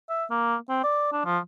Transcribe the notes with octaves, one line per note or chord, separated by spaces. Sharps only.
E5
A#3
C4
D5
D4
F3